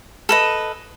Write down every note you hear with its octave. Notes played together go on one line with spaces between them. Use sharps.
A4 B4 D#5